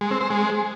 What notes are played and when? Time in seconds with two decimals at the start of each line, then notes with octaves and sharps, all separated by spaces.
0.01 G#3
0.11 C4
0.21 C5
0.30 G#3